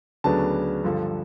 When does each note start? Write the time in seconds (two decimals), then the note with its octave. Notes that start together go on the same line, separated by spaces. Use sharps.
0.24 D2 C#3 F#3 B3 D4 A5
0.84 G2 D3 F3